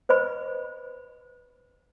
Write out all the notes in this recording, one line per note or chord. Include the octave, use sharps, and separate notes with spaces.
B4 C5 D#5 B5